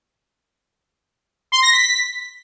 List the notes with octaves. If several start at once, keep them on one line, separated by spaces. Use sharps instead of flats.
C6
A#6
B6